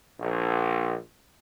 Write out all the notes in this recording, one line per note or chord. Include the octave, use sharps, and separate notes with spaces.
A#1